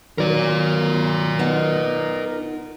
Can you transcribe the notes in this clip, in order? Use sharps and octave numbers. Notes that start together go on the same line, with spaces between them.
D#3 F#3 A#4 D5
B3 D#4